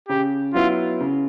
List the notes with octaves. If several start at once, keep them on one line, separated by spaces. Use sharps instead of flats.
C#3 G4
F#3 B3 E4 F4
C#3